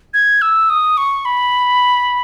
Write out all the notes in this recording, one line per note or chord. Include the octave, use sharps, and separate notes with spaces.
G#6
E6
D#6
C#6
B5